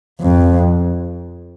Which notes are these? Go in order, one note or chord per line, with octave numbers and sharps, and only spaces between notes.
F2